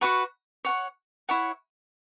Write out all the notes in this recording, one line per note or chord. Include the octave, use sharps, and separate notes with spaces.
F#4 B4 F#5 C#6
C#5 F#5 C#6
E4 C#5 F#5 C#6